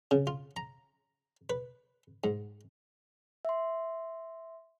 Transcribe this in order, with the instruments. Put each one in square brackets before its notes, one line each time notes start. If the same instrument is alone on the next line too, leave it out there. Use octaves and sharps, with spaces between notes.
[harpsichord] C#3
F4
A#5
B4
G#2
[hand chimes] E5 C6